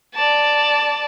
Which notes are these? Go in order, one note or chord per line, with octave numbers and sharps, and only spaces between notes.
D5 A5